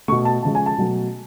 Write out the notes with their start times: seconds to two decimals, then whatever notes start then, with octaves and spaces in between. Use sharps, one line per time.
0.08 A3 C#6
0.12 B2
0.25 A5
0.43 C#3 F3 G#3 A5
0.55 G#5
0.66 A5
0.78 B2 F#3 A3